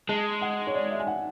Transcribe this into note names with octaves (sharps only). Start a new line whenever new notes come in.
G#3 A5
F#5
C#5
D5
E5
G#5
F#5